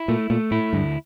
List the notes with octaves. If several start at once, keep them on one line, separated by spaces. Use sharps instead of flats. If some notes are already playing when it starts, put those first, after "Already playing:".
Already playing: E4
A#2 A3
A#2 A3
A2 E4
D2 G2